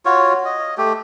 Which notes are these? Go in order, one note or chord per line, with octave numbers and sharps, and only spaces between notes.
F4 F#4 C#5
D#5
A3 G4